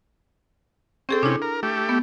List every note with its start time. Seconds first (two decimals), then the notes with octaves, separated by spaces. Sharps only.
1.09 C4 C#4 G#4 A4
1.23 C3 C#4 D4 E4
1.42 A#4
1.63 A3 G4
1.89 B3